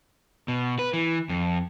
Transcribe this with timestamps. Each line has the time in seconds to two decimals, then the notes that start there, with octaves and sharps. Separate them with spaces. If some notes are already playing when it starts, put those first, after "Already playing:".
0.48 B2
0.79 B4
0.93 E3
1.29 F2